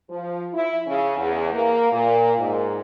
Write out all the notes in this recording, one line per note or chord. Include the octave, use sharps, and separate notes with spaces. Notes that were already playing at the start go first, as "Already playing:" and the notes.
F3
E4
C#3
E2
A#3
A#2
G#2